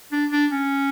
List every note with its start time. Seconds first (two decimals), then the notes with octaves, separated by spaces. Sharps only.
0.12 D4
0.32 D4
0.51 C#4